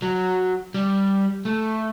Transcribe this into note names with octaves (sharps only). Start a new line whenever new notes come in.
F#3
G3
A3